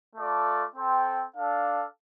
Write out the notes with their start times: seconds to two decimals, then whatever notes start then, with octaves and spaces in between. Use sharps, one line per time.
0.15 A3 F4 A4 D5
0.76 C4 A4 C5 G5
1.36 D4 A4 F5